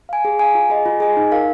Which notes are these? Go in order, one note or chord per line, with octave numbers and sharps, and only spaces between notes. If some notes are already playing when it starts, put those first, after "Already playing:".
F5 G#5
G#4
F5 G#5
F4
G#4 D#5 G#5
F4
G#4 D#5 G#5
D#4
A#4 F5